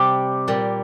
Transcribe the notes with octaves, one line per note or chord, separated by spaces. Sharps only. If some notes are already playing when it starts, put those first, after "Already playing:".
Already playing: C3 G3 G4
A#2 G3